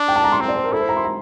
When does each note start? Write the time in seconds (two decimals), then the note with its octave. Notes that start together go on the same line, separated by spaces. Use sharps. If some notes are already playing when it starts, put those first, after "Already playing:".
Already playing: D4
0.08 G5
0.16 A5
0.24 A#5
0.32 C6
0.40 C4 A#5
0.48 D5
0.56 C5
0.64 A#4
0.72 E4 A4
0.80 C5
0.89 A#5
0.97 C6
1.05 A#5